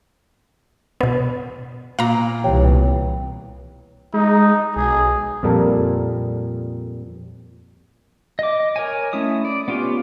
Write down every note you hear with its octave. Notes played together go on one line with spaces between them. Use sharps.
B2 B3
A#2 F5 A#5
C2 B2 E3 G4 C#5 G5
G#3 D#4
B1 G#4
F2 A#2 G3 A4 A#4
D#5 D6
A#4 C#5 G#5
A3 C#4 E4 D#6
D5
B3 C#4 F4 G4